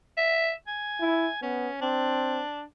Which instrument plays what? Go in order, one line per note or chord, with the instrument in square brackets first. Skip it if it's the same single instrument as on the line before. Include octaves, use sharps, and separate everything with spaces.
[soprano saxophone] E5
G#5
[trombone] E4
[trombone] B3 [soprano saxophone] C#4
[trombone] C4 [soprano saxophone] D4